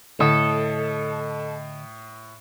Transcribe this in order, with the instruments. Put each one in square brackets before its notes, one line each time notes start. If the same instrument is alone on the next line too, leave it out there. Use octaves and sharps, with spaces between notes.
[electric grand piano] A2 [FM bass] D3 [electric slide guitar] A4 [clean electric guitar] D#5